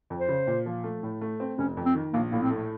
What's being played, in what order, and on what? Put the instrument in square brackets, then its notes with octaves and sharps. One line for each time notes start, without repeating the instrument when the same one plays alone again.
[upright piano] F2
[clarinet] C5
[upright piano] C#3
A#2
F3
A3
A2
A3
C4
[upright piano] F1 [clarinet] C#4
[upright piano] F2
[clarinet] C4
[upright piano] D#3
[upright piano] A#1 [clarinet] A#3
[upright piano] A2 [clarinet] A#3
[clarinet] C4
[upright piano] A3